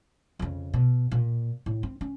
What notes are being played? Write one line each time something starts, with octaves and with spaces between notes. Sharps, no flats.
F2 C#3
B2
A#2
A2
C4
C#4